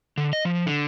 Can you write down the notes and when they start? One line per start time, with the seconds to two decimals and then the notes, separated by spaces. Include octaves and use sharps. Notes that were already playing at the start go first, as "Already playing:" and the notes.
0.17 D3
0.33 D#5
0.45 F3
0.66 D3